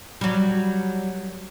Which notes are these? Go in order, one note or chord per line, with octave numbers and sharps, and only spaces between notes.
F#3 G3